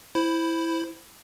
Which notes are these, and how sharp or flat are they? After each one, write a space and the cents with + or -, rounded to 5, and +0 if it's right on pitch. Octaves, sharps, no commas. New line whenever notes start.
E4 +0 C5 +0 B5 +15